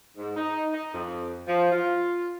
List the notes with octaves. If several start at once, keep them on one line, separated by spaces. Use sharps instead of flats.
G#2
D#4
D#4
F2
F3
F4